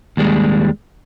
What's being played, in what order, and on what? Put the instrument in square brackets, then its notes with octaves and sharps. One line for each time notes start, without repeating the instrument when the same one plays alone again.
[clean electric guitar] D#2 G3 G#3